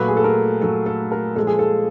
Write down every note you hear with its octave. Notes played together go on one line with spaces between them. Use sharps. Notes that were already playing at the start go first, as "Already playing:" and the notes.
Already playing: A#2 F#3 A3 B4
G#4
A4
A#4
A#2 F#3 A3 A4
A4
A#4
A#2 F3 G#3 A4
G#4
A4